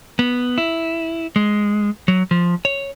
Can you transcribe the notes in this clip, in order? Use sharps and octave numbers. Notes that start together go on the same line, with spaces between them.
B3
E4
G#3
F#3
F3
C#5